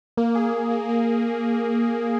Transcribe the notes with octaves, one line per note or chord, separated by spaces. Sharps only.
A#3
G#4
A#3
A#3
A#3